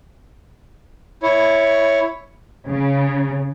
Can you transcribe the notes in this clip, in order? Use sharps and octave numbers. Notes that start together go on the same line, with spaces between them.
E4 C#5
C#3